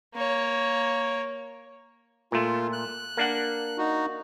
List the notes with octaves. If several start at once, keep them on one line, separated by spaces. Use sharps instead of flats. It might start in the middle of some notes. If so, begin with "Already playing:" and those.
A#3 C#5
A#2 A3 F4
F#6
A#3 D4 F#5
D#4 F#4